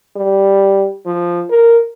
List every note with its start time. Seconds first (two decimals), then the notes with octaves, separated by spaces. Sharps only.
0.16 G3
1.06 F3
1.50 A#4